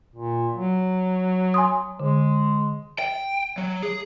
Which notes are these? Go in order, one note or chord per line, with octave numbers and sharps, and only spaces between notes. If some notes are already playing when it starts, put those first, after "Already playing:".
A#2
F#3
G#5 C6 D#6
D3 G#3
G5
F#3
G#4